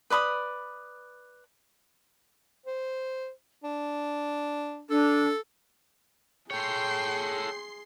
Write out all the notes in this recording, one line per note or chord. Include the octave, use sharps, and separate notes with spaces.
B4 D5 B5 D#6
C5
D4
D4 A4
G#4 A4 C#5 G5 C6 C7